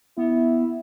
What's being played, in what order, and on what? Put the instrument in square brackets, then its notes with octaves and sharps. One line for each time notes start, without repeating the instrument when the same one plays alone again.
[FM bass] B3 [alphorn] E4